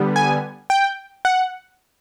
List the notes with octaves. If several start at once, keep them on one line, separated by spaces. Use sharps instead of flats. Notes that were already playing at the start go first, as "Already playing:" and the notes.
Already playing: D3 G3 B3
G#5
G5
F#5